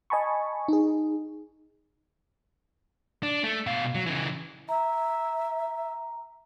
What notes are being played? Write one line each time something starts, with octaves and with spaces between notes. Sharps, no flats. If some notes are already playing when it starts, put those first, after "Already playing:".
D#5 G#5 A5 B5 C#6
D#4 G#4
D4
A3
B2 F5
F#3
C#3 E3
E5 A#5